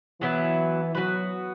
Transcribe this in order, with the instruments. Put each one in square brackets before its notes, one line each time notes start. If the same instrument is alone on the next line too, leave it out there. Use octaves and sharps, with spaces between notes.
[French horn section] E3 [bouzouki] F#3 B3 E4
[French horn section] F#3 [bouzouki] B3 F#4 B4